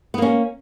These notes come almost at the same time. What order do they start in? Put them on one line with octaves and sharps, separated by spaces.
B3 A#3 C#4